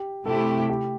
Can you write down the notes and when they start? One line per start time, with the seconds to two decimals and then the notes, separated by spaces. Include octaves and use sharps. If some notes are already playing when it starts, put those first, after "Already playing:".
Already playing: G4
0.26 C3 A3 E4 G4 A4
0.70 G4